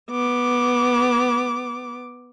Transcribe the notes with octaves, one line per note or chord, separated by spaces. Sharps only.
B3 D6